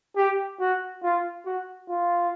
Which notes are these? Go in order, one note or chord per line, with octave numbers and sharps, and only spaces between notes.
G4
F#4
F4
F#4
F4